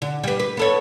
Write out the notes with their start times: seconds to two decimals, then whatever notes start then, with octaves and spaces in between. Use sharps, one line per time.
0.02 D3
0.24 G3 B4
0.39 B4
0.57 B3 A4 C#5